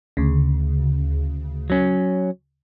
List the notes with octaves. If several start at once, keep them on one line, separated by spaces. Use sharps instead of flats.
D2 C#3
F#3 C#4